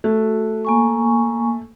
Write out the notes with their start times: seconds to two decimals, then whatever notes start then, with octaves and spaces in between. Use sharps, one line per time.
0.04 A3 F#4
0.65 A#3 G#5 C#6